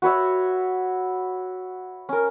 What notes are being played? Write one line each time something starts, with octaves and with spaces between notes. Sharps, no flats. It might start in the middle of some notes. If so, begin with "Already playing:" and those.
F#4 B4 C#5 E5
C#4 A#4